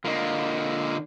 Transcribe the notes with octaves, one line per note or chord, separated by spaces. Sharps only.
D3 A#3 F4 D#5